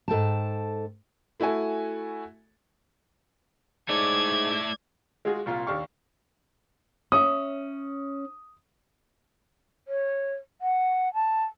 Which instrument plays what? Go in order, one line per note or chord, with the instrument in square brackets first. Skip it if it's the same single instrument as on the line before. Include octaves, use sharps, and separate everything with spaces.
[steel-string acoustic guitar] G#2 A4 G5 A5
[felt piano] A3 E4 F#4 A4 G#5
[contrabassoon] G#2 [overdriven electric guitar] A3 E4 [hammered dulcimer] D5 [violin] G#6
[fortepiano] G#3 F4 F#4 G#4
C2 A#2 F4 F5
D#2 D4 G4 F5 C#6
[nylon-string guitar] C#4 E5 [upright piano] D#6
[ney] C#5
F#5
A5